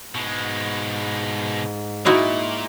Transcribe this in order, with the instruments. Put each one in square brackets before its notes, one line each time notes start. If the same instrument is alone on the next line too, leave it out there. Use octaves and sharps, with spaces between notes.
[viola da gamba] G#2 [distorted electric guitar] B2 G#3
[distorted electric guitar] A#2 [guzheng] D#4 E4 F#4